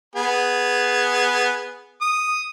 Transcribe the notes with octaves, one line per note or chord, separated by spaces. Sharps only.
B3 G#4
D#6